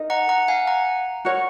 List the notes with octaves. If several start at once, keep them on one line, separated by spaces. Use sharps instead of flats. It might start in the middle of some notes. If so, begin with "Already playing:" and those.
Already playing: D#4 A#4 D#5
F#5 A#5
F#5 A#5
F5 G#5
F#5 A#5
F#4 A#4 C#5